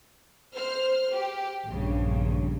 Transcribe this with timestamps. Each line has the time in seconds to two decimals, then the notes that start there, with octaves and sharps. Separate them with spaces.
0.54 C5 F6
1.13 G4
1.67 A#1 E2 G2 C#3